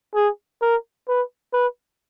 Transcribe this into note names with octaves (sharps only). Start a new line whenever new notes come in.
G#4
A#4
B4
B4